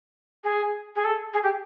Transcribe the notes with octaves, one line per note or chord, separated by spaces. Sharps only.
G#4
G#4
A4
G#4
G4